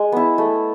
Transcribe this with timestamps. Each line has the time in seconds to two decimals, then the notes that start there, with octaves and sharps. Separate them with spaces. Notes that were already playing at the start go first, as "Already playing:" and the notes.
Already playing: G#3
0.12 B3 E4
0.38 A3